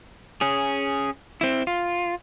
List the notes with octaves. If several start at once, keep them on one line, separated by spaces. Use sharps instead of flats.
C#4 G#4
C4 E4
F4